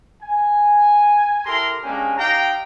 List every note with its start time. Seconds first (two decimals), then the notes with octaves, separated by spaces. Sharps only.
0.23 G#5
1.46 E4 G4 A4 A#4 A#5 C6
1.84 G#3 A#3 C#4 D4 G4 G#5
2.18 D#4 G4 F5 G5 A#5